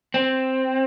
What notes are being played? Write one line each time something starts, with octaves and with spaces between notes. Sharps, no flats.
C4